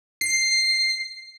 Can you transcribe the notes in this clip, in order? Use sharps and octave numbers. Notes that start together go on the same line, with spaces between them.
C7